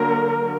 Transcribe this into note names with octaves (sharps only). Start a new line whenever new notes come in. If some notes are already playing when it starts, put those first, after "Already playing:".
Already playing: D3 F#3 A#3 A#4